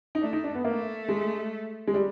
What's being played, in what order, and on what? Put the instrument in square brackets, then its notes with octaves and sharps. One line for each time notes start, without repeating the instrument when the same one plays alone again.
[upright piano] D#4
[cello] A3 [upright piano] D4
[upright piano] D#4
D4
B3
[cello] A3 [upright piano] A#3
[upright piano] G#3
G#3
G3